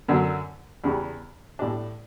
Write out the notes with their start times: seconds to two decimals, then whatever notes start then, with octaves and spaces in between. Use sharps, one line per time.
0.08 F#2 D3 F#3
0.84 E2 C#3 G3
1.59 A2 G3 D4